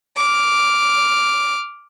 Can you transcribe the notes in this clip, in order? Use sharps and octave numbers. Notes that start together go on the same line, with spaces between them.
D6 F6